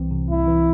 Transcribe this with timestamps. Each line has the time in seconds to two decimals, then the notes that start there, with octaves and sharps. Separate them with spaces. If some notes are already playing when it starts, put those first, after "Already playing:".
Already playing: C2 E3 C4
0.11 C3
0.29 C2 E4
0.47 E3